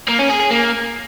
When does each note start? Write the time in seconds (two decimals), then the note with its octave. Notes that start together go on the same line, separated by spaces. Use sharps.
0.08 A#3
0.19 C#4
0.30 G#4
0.40 G#4
0.51 A#3